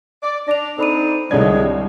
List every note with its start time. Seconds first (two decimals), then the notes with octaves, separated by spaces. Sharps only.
0.23 D5
0.48 D4 A#6 F7
0.78 C4 D4 D#4 A4 B5 D#7
1.31 C2 D3 D#3 G#3 E4 C#5 D5 G#6